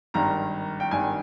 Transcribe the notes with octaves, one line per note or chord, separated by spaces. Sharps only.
G#1 G2 D#3 A#5
G5
G#1 G2 D#3 G#5